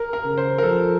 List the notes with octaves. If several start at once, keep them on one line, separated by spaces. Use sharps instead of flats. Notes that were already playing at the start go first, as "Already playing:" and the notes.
Already playing: A#4
A#4
C#3
C5
A#4
F3 A4